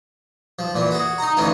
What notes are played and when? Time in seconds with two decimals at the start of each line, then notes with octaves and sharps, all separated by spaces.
0.59 F3
0.75 A#2 E3
0.91 F#4 G#4
1.18 D#4 A#5
1.37 D2 C#3 E3 D#4 F4